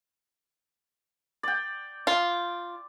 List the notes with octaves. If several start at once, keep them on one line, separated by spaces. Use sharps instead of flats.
D5 G5
F4